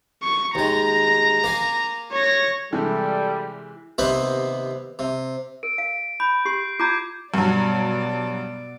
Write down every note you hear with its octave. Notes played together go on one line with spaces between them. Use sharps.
C#6
D#2 G#3 A#5
A#3 F5 G#5
C#5 A#6
C3 E3 G3 G#3 A4
D#2 C3 B3 C4 F#5 B5
C3
A#4 D7
F5
B5 G6
G4 C6 C7
F4 A#5 D6 G6 G#6
G2 B2 F#3 D5